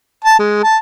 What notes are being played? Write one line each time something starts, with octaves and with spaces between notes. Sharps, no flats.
A5
G#3
A5